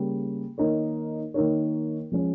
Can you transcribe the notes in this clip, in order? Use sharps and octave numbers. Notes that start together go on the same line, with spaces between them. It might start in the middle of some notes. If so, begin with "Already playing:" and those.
Already playing: C#3 G3 A#3
D#3 A#3 D#4 A#4 C#5
D#3 A#3 D#4 A#4 C#5
F3 G#3 C#4